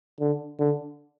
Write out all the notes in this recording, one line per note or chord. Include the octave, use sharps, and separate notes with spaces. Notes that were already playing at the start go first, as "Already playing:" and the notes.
D3
D3